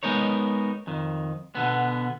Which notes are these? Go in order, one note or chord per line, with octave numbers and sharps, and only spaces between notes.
G#3 B3 D#4 A#4 C#5
F2 D#3
B2 D3 B3